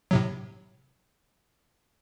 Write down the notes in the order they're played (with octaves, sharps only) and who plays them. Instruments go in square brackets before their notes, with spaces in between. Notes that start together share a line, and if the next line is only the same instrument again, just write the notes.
[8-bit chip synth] A2 C3 F#3